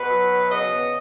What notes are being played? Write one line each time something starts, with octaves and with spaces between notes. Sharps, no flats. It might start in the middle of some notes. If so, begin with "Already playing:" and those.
Already playing: B2 B4
F#3
B2
C#3 D#5
B3